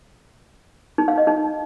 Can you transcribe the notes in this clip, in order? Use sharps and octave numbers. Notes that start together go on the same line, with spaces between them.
D#4
F5
D#5
D#4